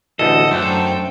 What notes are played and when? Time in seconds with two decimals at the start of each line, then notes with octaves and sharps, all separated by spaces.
0.19 A1 D2 A4 D#5
0.51 F#2 A3 D4 C5 G5